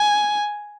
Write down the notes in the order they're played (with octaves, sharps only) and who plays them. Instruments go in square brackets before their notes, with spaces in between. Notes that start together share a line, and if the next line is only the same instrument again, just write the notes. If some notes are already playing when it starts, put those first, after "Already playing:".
Already playing: [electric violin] G#5